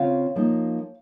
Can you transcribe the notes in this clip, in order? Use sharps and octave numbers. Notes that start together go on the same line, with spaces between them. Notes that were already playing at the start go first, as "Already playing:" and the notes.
Already playing: C#3 C4 F4 C#5 F5
F3 A#3 D#4